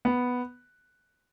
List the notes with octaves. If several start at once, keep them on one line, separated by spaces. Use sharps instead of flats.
B3